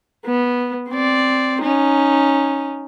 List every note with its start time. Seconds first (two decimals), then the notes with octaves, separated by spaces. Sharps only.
0.25 B3
0.90 C4 D5
1.62 C#4 D#4